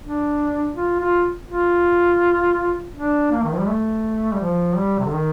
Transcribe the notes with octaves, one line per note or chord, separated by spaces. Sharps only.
D4
F4
F4
F4
D4
A#3
D#3
F3
G3
A3
G3
F3
G3
C3
D3
D#3